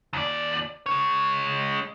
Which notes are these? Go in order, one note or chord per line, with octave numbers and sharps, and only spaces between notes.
D#2 D5
G#3 C#5